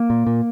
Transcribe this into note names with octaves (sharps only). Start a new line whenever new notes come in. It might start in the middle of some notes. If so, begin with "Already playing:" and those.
Already playing: A#3
A#2
A#2